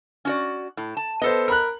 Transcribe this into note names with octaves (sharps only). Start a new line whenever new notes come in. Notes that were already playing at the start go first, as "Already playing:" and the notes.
C#4 F#4 D5
A2
A5
B3 A4 C5 D#5
A#4 B5 F#6